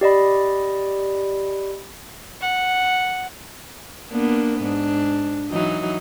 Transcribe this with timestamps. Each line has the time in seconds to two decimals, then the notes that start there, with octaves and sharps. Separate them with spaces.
0.01 G4 D5 D#5 B5
2.41 F#5
4.11 A#3 B3 D4
4.63 G#2 D4
5.49 E3 F#3 D#4